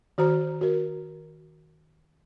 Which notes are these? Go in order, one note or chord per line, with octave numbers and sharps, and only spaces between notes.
D#3 F#4 C5 A#5
F#4 A#4